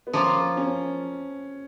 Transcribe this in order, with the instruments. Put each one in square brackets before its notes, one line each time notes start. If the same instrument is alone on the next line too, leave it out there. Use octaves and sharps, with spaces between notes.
[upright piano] B3
[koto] F3 A#3 F4 [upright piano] C#4
[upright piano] C#4